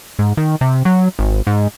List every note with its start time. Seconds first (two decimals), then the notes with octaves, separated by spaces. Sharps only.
0.19 G#2
0.37 D#3
0.61 C3
0.85 F#3
1.19 G#1
1.47 G#2